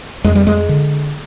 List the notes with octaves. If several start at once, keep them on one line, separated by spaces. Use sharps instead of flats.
F2 G#3
G3
G#3
D3